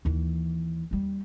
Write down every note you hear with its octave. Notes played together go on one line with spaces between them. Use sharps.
D#2 E3
D#2 G3